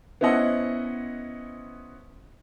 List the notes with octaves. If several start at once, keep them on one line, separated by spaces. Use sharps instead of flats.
B3 C#4 E4 C5 D#5 F#5